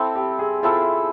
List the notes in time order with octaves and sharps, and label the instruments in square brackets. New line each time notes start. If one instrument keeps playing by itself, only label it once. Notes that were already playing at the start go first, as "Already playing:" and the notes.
Already playing: [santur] C4 E4 A4
[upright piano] G4
G#4
[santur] C4 E4 A4 [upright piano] F4